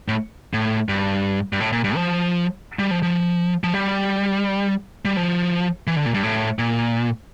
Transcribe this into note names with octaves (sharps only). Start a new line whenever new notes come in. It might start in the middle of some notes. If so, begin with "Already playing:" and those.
A2
A2
G2
G2
A2
A#2
G2
F3
G3
F3
F3
F3
G3
G3
F3
E3
D3
A#2
G2
A2
A#2